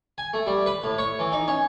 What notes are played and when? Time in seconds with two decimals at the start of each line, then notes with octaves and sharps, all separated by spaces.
0.18 G#5
0.34 A3
0.46 G3
0.66 B4
0.83 A2
0.98 C#5
1.19 E3
1.32 D#4
1.48 C#4